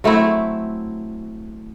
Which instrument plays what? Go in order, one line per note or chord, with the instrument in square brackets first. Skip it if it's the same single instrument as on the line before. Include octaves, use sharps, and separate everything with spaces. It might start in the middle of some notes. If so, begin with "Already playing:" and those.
[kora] F#3 A3 C4 E4